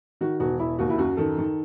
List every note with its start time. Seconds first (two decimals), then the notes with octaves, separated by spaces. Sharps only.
0.21 D#3 F#4
0.40 E1 F#4
0.59 E1 E4
0.79 D#2 F#4
0.90 E4
0.98 F#2 F#4
1.17 D#3 A4
1.38 D#3